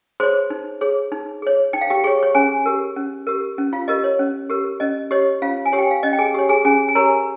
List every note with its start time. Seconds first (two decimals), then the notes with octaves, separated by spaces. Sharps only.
0.20 G#4 C5 C#5 C6
0.50 D#4
0.81 G#4 C#5
1.12 D#4
1.42 G#4 C#5
1.73 D#4 G5
1.81 F5
1.90 G4 G5
2.04 G#4 C#5 C#6
2.23 C#5 C#6
2.35 C#4 G#4 G#5
2.66 G4 A#4
2.96 C#4
3.27 G4 A#4
3.58 C#4
3.73 F4 F5
3.88 G4 A#4 D#5
4.04 C#5
4.19 C#4
4.50 G4 A#4
4.80 C#4 D#5
5.11 G4 C#5 D#5
5.42 C#4 F4 F5
5.65 G#5
5.72 G4 C#5
5.78 G5
5.91 F5
6.03 C#4 D#5
6.13 G5
6.19 G#4 G#5
6.34 G4 C#5
6.49 G#4 G#5
6.65 C#4 G#4 G#5
6.89 G#5
6.95 G4 A#4 C#5 A#5